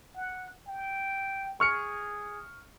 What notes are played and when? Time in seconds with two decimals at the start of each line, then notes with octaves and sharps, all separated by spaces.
0.16 F#5
0.68 G5
1.60 G#4 C#6 F6 C#7